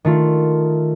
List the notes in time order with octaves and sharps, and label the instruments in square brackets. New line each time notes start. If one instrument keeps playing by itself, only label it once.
[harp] D#3 A3 F4